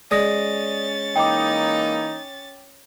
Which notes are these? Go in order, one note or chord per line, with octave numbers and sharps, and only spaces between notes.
G#3 C#4 D5 D#6 A6 A#6
E3 A#3 D#4 G5 D6